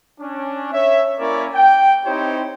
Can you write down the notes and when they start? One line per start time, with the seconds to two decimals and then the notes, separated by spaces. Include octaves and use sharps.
0.21 C#4 D4
0.73 C#5 E5
1.19 A#3 C#4 E4 A#4 C#5 D5
1.55 G5
2.06 C4 D#4 E4 G4 C5 C#5